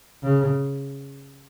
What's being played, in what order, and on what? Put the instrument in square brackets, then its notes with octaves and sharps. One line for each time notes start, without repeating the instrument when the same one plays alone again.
[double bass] C#3